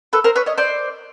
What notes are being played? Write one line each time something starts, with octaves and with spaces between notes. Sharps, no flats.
A4 B4
A#4 C5
B4 C#5
C#5 D#5
C5 D5